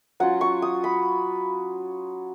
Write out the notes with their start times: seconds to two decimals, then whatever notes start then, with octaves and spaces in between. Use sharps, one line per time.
0.20 F#3 C#4 F4 F#5
0.41 C#6
0.62 D#6
0.84 B5